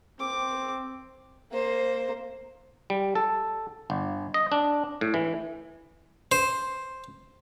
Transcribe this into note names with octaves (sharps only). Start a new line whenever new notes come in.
C4 D6
A#3 C5
G3
A4
G1
D#5
D4
A2
E3
C5